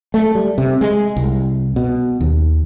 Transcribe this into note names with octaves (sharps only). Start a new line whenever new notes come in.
A3
G3
C3
G#3
C2
B2
D#2